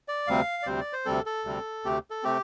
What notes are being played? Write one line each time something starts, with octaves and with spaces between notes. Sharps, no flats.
D5
D2 C3 G3 C4 F5
D5
D2 C3 G3 C4 C5
D5
C5
D2 C3 G3 C4 A4
A4
D2 C3 G3 C4
D2 C3 A3 C4 G4
A4
C3 A3 C4 G4